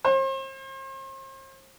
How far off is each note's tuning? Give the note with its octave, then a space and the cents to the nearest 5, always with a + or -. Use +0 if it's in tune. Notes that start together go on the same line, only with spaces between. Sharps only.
C5 +40